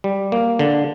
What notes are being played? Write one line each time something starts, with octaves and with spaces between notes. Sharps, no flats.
G3
A#3
D3